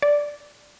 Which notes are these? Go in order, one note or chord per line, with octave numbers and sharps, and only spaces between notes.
D5